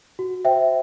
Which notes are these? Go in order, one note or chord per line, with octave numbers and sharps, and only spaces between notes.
F#4
C5 E5 G5